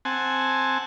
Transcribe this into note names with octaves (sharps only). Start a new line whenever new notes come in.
C4 F#5 G#5 A5